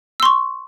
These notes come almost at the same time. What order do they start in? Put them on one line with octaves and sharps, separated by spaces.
E6 C6 C#6